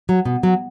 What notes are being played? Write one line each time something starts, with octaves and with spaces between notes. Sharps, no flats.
F#3
B2
F#3